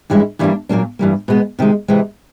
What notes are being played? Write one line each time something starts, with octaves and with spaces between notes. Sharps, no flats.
G2 E3 G#3 C#4 E4
G2 E3 G3 A#3 D4
A#2 F#3 A#3 D4
G2 E3 G3 A#3
B2 G#3 B3
C3 D#3 G#3
C3 E3 G#3 C4